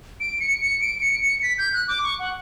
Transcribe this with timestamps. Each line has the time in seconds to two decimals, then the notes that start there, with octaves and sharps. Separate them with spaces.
0.20 D7
0.40 C#7
0.61 C#7
0.81 D7
1.01 C#7
1.22 C#7
1.43 B6
1.58 G6
1.74 F#6
1.88 D6
2.04 C#6
2.19 F#5